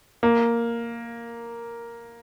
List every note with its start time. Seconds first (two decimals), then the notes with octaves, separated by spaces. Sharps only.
0.23 A#3